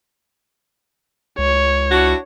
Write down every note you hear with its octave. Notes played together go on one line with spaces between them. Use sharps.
C#2 C#5
D4 E4 F#4